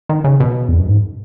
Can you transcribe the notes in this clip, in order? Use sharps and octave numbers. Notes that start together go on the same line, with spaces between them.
D#3
C#3
B2
E2
F#2
G#2